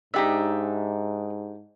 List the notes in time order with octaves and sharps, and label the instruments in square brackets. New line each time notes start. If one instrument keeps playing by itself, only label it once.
[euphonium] G#2 [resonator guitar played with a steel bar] D4 G4 [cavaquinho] D#4 F4 E5